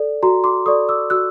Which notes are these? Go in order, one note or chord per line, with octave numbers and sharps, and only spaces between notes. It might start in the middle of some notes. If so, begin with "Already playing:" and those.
Already playing: A4 D5
F#4 A#5 C6
C6 D6
A4 D5 C#6 D#6
D6 E6
F#4 E6 F#6